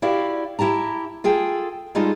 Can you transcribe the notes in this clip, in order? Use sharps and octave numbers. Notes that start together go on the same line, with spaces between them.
E4 F#4 G4 D5 F5
E4 G4 A5 A#5
F4 G#4 A4 G5
G3 G#3 D#4 F4 G#4 A4